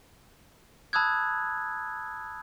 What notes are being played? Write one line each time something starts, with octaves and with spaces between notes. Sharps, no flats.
A5 B5 D#6 E6 F#6 G#6